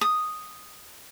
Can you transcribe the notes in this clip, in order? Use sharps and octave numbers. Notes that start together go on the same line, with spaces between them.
D#6